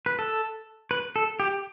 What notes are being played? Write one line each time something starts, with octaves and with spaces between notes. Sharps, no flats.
B4
A4
B4
A4
G4